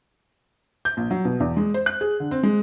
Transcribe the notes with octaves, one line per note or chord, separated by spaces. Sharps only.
G6
A#1
F#3
B2
E2
G#3
C5
F#6
G#4
D3
C4
G#3